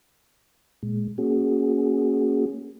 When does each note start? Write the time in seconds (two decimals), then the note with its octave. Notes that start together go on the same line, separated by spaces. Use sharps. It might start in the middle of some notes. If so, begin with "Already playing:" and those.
0.83 A#2 G#3
1.18 A#3 C#4 F#4 G#4